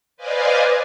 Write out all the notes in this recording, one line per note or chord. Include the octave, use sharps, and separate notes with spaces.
B4 C5 D5 D#5 F5 G#5